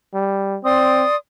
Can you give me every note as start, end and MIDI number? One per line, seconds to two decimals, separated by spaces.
0.14 0.57 55
0.64 1.04 60
0.64 1.16 74
0.64 1.16 84
0.64 1.16 87